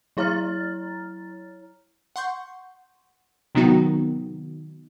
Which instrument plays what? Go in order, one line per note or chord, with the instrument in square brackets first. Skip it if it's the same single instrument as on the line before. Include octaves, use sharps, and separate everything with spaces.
[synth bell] F#3 E4 C#5 A#5 F6 A6
[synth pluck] F#5 C6 C#6 G6
C3 D#3 F#3 B3 D#4 F#4